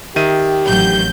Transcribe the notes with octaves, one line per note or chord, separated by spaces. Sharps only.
D#3 G4 E5 D#7
A1 F#3 G6